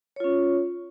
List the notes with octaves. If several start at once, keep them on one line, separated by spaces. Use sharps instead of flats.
C#4 F4 C#5